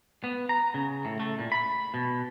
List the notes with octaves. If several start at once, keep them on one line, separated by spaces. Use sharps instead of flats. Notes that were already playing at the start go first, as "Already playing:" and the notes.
B3
A#5
C#3
A2
A3
A#2
B5
B2